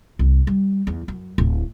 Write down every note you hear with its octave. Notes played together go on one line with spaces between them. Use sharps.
C2
G3
E2
F#2
D1 A2